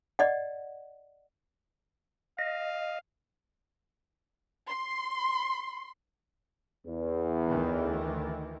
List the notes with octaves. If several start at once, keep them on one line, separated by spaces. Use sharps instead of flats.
D5 D#5 F#5
D#5 F5
C6
E2
D2 D#3 E3